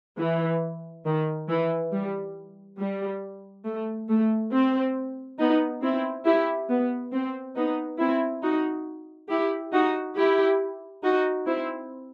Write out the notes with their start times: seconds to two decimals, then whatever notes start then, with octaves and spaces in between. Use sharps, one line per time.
0.18 E3
1.05 D#3
1.48 E3
1.92 G3
2.79 G3
3.65 A3
4.09 A3
4.52 C4
5.39 B3 D#4
5.82 C4 E4
6.25 E4 G4
6.69 B3
7.13 C4
7.56 B3 D#4
7.99 C4 E4
8.42 D#4 F#4
9.29 E4 G4
9.72 D#4 F#4
10.16 E4 G4
11.03 D#4 F#4
11.46 C4 E4